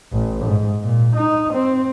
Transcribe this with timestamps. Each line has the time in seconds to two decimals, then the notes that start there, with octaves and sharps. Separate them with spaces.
0.13 A1
0.45 G#2
0.83 A#2
1.16 D#4
1.53 C4